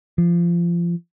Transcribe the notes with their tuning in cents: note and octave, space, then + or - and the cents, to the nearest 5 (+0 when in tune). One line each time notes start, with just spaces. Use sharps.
F3 -25